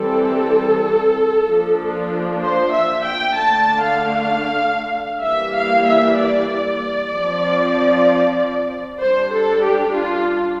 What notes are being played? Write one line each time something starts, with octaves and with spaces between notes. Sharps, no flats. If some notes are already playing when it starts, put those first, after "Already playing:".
Already playing: E3 G3 C4 A4
F3 A#3 D4
C5
E5
G5
D3 A3 D4 A5
F5
E3 G3 A#3 E5
F5
E5
D5
F3 C4
G3 D4 C5
A4
G4
F4